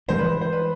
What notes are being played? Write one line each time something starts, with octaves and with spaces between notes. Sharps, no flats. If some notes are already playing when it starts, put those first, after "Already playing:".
G2 E3 G#3 C5
B4
C5
B4